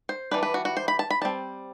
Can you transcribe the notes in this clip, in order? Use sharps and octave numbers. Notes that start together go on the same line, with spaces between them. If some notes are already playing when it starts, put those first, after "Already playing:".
C5
E3 G3 D4 B4
B4
F#4
F#4
C5
B5
A5
B5
G3 C4 A5